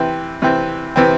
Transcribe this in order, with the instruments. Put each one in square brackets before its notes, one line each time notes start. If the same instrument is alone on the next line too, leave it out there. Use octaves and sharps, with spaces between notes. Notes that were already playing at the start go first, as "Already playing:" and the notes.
Already playing: [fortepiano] C3 E3 C4
C3 E3 C4
C3 E3 C4